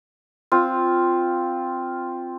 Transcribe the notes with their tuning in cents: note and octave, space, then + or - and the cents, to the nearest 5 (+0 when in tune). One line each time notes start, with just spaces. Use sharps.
C4 +0 F4 +0